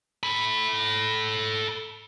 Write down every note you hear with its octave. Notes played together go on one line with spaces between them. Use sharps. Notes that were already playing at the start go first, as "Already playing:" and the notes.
A4 B5